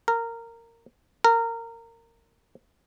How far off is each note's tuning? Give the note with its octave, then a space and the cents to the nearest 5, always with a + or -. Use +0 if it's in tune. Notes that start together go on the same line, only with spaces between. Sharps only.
A#4 -15
A#4 -20